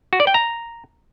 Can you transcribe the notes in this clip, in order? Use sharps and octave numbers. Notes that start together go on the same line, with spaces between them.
F#4
D5
G5
A#5